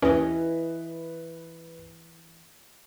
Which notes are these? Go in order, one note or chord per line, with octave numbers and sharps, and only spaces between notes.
D#2 E3 C#4 B4 D#5